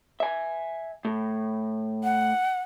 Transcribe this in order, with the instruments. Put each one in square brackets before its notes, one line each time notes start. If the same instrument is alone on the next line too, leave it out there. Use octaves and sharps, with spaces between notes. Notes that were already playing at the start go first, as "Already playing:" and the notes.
[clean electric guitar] E5 G#5
A2
[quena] F#5